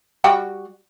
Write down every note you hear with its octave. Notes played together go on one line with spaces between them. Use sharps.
G3 F#4 G5